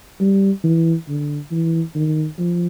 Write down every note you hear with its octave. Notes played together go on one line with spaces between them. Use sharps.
G3
E3
D3
E3
D#3
F3